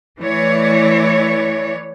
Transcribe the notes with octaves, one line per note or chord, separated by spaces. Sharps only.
E3 A3 C#5 D5